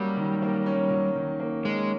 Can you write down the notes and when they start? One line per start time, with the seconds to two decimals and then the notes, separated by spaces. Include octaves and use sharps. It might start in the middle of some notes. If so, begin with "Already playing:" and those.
Already playing: F#3 G3 A#3 C#4
0.17 D#3
0.42 A#3
0.66 C#4
0.90 F#3
1.16 D#3
1.40 A#3
1.65 G#3 C#4